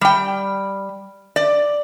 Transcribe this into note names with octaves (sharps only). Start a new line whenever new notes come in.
G3 G5
D5